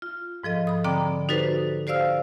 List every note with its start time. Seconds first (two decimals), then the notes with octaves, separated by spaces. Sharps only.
0.02 F4
0.43 G#2 F3 A4 D#5
0.67 B5 D#6
0.84 D3 C4 D5 G5 A#5 D6
1.29 D#4 F#4 G4 A4 B4 C5
1.87 G4 C5 D5 F5 E6 F6